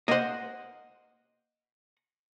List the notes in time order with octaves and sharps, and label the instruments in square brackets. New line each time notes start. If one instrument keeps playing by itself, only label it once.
[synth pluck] A#3 C5 [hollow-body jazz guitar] D#5 F#5